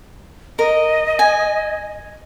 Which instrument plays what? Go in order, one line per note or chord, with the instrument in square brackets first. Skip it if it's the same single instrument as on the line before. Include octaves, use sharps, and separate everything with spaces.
[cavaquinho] A#4 [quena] D#5
[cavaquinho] G#5